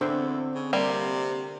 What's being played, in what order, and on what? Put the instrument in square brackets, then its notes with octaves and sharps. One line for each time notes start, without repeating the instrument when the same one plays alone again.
[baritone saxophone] E2 [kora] D3 E5 [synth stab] C4
[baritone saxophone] C#3
[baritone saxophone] C3 [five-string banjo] G3 A#3